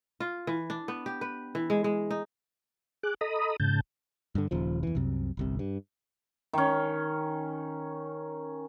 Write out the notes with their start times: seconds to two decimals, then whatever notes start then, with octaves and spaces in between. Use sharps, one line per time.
0.20 F4
0.47 E3
0.70 D4
0.88 B3
1.06 G4
1.21 B4
1.55 E3
1.70 G#3
1.84 G#3
2.11 D#4
3.03 G#4 D6 F#6
3.21 A4 D#5 A#5 B5 D#6
3.60 G#2 C#3 A5 G6
4.35 G2 D3
4.51 D#1 D#2 C#3 F3
4.83 E2 E3
4.95 C2 F#2 C3
5.37 G1 C2 C3
5.59 G2
6.53 D#3 C#4